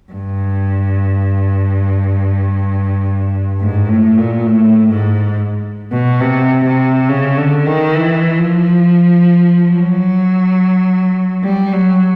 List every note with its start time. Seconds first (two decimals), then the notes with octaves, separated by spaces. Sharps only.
0.12 G2
3.60 G#2
3.89 A2
4.18 A#2
4.47 A2
4.90 G#2
5.92 B2
6.21 C3
6.65 C3
7.09 C#3
7.38 D3
7.66 D#3
7.96 E3
8.39 F3
9.70 F#3
11.43 G3
11.73 F#3